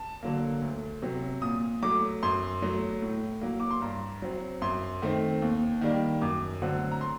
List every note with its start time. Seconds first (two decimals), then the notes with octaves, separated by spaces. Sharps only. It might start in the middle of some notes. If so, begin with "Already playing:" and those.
Already playing: A5
0.23 D3 F#3 A#3
0.62 D2
1.02 C3 F#3
1.42 A#2 D#6
1.82 F#3 A3 D6
2.23 F#2 C6
2.62 F#3 A3
3.02 A2
3.41 F#3 A#3
3.60 D6
3.71 C6
3.82 G2 A#5
4.22 F#3 C4
4.62 F#2 C6
5.02 D#3 A3 C4
5.42 D#2
5.81 D#3 G3 A#3
6.21 F#2 D6
6.62 D3 F#3 A3 C4 F#5
6.92 A#5
7.01 C6